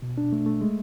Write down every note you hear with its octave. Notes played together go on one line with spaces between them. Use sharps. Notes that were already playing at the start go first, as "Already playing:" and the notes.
B2
D4
A3
A3
G#3